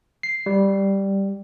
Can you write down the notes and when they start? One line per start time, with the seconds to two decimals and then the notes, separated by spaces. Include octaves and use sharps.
0.23 C7
0.46 G3